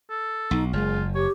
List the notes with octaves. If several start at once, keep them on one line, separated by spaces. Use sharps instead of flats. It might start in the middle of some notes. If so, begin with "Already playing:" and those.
A4
B1 D#4
F#1 G#3 F4
G4 C#5